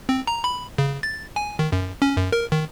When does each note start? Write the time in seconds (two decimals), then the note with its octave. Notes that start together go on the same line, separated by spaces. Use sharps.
0.09 C4
0.27 A#5
0.44 B5
0.78 C#3
1.03 A6
1.36 G#5
1.59 D#3
1.72 F#2
2.02 C#4
2.17 F#2
2.32 A#4
2.52 D#3